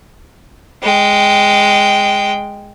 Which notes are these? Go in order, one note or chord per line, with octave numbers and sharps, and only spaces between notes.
G#3 G5